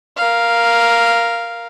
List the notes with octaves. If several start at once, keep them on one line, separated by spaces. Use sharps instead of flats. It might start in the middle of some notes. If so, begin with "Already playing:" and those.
A#4 F5